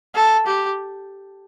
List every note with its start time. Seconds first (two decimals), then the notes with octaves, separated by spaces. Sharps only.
0.15 A4
0.46 G4